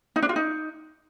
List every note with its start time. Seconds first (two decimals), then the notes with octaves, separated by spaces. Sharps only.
0.16 D#4
0.23 D4
0.29 F4
0.36 D#4